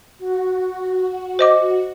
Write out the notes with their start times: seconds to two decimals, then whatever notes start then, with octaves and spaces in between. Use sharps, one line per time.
0.19 F#4
1.39 C5 D#5 D6